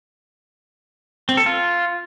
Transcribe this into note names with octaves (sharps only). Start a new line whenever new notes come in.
C4
A4
F4